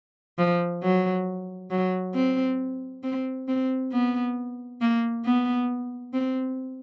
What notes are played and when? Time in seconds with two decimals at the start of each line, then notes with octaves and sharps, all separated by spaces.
0.38 F3
0.83 F#3
1.71 F#3
2.14 C4
3.03 C4
3.48 C4
3.92 B3
4.81 A#3
5.25 B3
6.13 C4